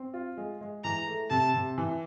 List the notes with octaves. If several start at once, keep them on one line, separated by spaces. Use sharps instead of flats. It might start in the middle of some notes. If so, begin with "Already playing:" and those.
Already playing: C4
F4
G#3
G#3
E3 A#5
A3
C3 A5
C3
E3